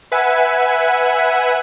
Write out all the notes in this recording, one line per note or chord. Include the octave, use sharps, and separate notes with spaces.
B4 E5 F#5 G#5